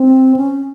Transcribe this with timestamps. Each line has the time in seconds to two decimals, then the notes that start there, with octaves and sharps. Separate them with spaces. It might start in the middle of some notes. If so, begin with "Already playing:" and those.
Already playing: C4
0.36 C#4